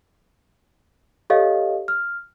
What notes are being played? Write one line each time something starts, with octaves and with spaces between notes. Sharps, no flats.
G4 A4 C#5 D#5 F5
F6